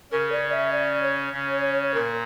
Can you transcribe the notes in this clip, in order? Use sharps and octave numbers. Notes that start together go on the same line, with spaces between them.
C#3 C#4 A#4
D5
E5
D5
C#5
C#3 C#4
A#2 A#3 A#4